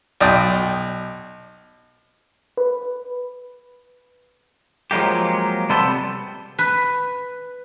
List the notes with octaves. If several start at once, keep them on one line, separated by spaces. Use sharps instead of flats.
B1 D5 G5 D#6
B4
F3 F#3 G#3 A#3 G4
C3 G3 B3 A4 C5
B4